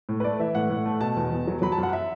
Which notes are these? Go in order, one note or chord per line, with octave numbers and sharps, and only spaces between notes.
A2
B4
A3 D5
E3 E5
A2 F#5
A2
A3
B2 A5
E2
E2
F#3
F#3 B5
A5
F#2 F#5
E5